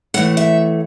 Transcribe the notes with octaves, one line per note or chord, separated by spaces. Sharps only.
A2 E3 A3 F#5
E5